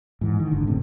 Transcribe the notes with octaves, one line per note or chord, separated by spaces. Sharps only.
G#2 E3
D#3
F#1 G#2 D3
A2 C3